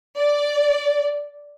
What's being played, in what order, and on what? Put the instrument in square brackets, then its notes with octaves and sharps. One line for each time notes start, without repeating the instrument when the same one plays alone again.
[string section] D5